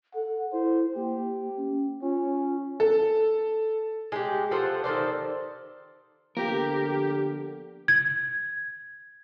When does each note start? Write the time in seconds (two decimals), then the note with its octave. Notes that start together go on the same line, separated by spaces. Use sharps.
0.14 A4 F#5
0.53 E4 C5
0.95 A#3 G4
1.57 C#4
2.02 C#4 F4
2.80 A4
4.12 G#3 G4
4.51 F3 A4 C5 F#5
4.84 D#3 A4 C5 D5
6.37 D3 F3 A#3 B3 G4 A#4
7.88 G#6